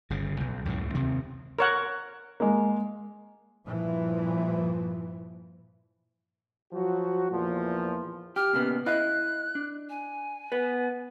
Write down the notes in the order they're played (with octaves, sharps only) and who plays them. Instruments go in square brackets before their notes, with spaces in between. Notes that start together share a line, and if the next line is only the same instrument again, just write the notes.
[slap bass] G1 C#3
B1
C#2 F#2 A2 C#3
D#2 C3 C4
[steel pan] A#4 C#5 F#5
[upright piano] G#3 A#3
[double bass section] G2 A#2 E3 F3
[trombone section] F3 F#3 F#4
E2 A#2 F3
[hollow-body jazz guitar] G4 [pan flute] F6
[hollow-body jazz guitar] A#2 C#3 B3
[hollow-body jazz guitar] E4 D#5 F5 [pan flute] F#6
[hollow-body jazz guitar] D4
[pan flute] G#5
[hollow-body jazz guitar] B3 B4